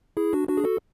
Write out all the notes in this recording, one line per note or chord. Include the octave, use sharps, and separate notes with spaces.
E4 G#4
D4 F#4
D4 F#4
G#4
F#4 A4